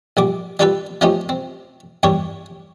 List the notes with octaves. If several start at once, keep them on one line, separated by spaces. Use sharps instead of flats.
A#1 G3 D6
G3 D4 F4 G4 A4 B4
F3 A3 C#4 D#4 F4 G4
C4
E2 G2 G3 G4 C#5